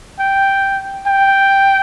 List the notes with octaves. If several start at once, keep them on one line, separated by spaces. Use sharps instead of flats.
G5
G5